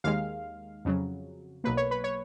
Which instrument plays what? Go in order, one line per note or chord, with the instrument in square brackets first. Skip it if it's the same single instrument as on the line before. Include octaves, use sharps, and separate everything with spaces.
[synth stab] D#2 D#3 G#3 F5
F2 C#3 F#3
B1 B2 F#3 A#3 B4
C#5
B4
C#5